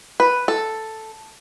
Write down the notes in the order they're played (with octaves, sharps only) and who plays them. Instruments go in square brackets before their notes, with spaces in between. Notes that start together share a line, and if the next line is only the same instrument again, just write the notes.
[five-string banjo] B4
A4